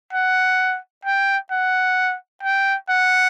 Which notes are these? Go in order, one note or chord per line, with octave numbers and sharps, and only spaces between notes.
F#5
G5
F#5
G5
F#5